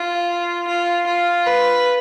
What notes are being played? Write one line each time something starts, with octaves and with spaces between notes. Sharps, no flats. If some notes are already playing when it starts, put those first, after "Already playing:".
Already playing: F4
F4
F4
B4